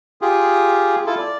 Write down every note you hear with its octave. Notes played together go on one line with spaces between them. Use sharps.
F4 G4 G#4
E4 F4 A4
D5